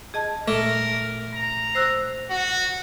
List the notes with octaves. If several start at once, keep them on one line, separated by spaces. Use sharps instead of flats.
G#4 D#5 A5
A#2 A3 A#4
A#5
C5 E6 F#6
F#4